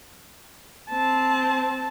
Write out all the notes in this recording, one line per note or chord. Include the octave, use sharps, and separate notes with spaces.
C4 A5